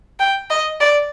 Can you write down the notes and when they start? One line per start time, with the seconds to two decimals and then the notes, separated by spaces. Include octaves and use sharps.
0.20 G5
0.50 D#5
0.80 D5